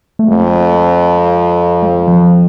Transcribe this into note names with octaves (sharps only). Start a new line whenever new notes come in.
A3
F2 G#3
G#3
F3